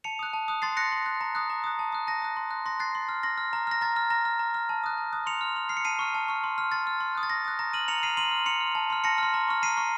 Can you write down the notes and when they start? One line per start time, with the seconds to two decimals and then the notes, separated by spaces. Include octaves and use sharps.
0.04 A5 C#7 F7
0.19 D#6 F#6
0.33 A5
0.48 D#6 F#6
0.62 C6 A6 C7
0.77 F#6 A#6 C#7
0.92 C6
1.06 F#6
1.21 A#5
1.35 D#6 F#6
1.50 A#5
1.64 D#6 F#6
1.79 A5
1.92 D#6 F#6
2.07 A5 A#6
2.22 D#6 F#6
2.37 C6
2.51 F#6
2.66 C6 A#6
2.80 F#6 A6 C7
2.95 C6
3.09 F6
3.23 C6 A#6
3.38 F6
3.53 A#5
3.67 F6 A#6
3.81 A#5 A6
3.96 F6
4.10 A#5 A#6
4.25 F6
4.39 A#5
4.54 F6
4.69 A5
4.84 D#6 F#6
4.98 A5
5.13 D#6 F#6
5.26 C6 C#7 F7
5.41 F6
5.56 C6
5.69 F6 C7
5.77 C#7
5.85 A5 C7 D#7
5.99 C#6 F6
6.14 A5
6.28 C#6 F6
6.44 C6
6.58 F6
6.72 C6 A6
6.87 F6
7.00 C6
7.15 D#6 F#6
7.23 A6
7.30 C6 A#6
7.45 D#6 F#6
7.59 A#5 A#6
7.73 F6 D#7 F#7
7.88 A#5 C#7 F7
8.03 F6 C7 D#7
8.17 C6 D#7 F#7
8.31 F6
8.46 C6 C#7 F7
8.60 F6
8.75 A5
8.90 C6 F6
9.04 A5 A#6 C#7
9.18 C6 F6
9.34 A#5
9.48 C#6 F6
9.62 A#5 C7 D#7
9.77 C#6 F6